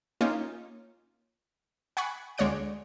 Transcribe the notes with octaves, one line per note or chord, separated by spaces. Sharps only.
A#3 C#4 D#4 F4
F#5 G#5 B5 C#6
D2 G#3 C#5 D5 F#5 D7